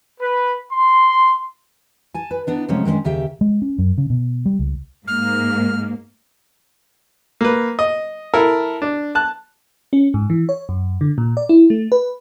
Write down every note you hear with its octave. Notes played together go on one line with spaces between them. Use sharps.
B4
C6
G#5 A5
B4
B3 D4 D#4
C3 F3 F#3 G#3 A3 C#4
D#3 G#3 A#3 C#4 D4
D#2 C#3 G4 E5 G5
G#3
C#4
F#2
C#3
B2
G3
C#2
G#2 A#3 F6
A#3 B4
D#5
E4 A4 A#4
D4
A5 F#6
C#4
G#2
E3
C#5
F#2
D3
A#2
D5
E4
A3
B4